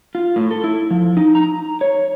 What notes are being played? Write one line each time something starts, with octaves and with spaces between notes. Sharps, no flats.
F4
A2
A4
E4
F3
D#4
A#5
C#5